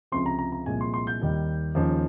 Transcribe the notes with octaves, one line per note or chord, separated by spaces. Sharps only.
C#2 C3 F3 C6
A#5
A#5
A#5
C2 A#2 F3 G#3 G#5
C6
C6
G6
D#2 D#3 G3
D#2 C#3 F3 G#3